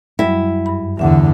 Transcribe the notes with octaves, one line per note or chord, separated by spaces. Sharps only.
F#2 F#3 G3 E4
G2 B5
F1 E2 G2 D3 E5 F#5